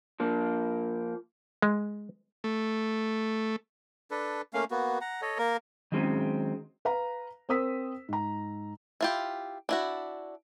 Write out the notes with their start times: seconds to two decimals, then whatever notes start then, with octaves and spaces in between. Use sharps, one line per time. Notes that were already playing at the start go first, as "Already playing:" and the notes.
0.20 F3 A#3
1.62 G#3
2.44 A3
4.11 D4 A4 B4
4.53 A3 A#3 C#4 F5
4.71 A#3 B3 F#4
5.01 F#5 A#5
5.22 A4 C#5 D#5
5.38 A#3 A#4
5.92 D#3 F#3 G#3 C4 C#4
6.85 B4 F5 A#5
7.49 C4 A#4 C5 D#6 E6 B6
8.09 G#2 A#5
9.01 E4 F4 G4
9.69 D4 E4 F#4